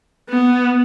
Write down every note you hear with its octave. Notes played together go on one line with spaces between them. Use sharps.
B3